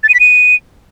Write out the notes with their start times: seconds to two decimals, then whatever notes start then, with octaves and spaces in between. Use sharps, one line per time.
0.03 A6
0.09 D#7
0.14 B6
0.20 D#7